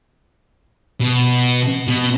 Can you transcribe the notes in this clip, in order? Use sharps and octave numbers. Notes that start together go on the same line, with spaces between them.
B2
B2